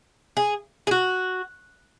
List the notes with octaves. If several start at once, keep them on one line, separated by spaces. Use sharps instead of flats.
G#4
G#4
F#4